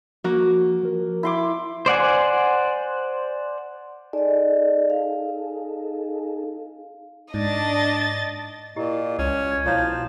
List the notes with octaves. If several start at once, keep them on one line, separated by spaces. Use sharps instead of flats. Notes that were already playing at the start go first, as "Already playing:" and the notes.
F3 A#3 F#4
F3 A#4
E4 C6 D6
C5 D5 F#5 G#5
D#4 G#4 A4 D5 D#5
F5
G#2 D4 D#5 A6
A#2 E4 G4 D#5
C#2 C#4
G#6
B1 F3 E4 C#5 F5 G6 G#6